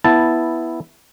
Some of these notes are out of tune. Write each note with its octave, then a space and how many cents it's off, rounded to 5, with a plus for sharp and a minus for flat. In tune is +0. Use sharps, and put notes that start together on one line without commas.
B3 -5 E4 +0 A5 +0